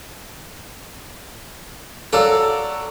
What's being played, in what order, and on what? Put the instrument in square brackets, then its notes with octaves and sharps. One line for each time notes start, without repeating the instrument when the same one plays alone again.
[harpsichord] F#3 F#4 D5 [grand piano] A4 F5 E6